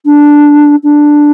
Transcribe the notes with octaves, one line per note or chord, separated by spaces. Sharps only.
D4
D4